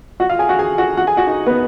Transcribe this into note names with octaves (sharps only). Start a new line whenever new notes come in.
F#4 F#5
F4 F5
G#4 G#5
F#4 F#5
G#4 G#5
F#4 F#5
F#4 F#5
G#4 G#5
F#4 F#5
D#4 D#5
B3 B4